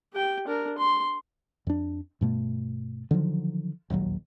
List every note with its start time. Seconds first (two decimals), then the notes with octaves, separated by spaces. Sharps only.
0.13 G4 G5
0.47 D4 A#4
0.78 C6
1.67 F2 D4
2.21 G2 B2 A3
3.11 D3 D#3 F3 F#3
3.90 E1 A#1 D#2 F#3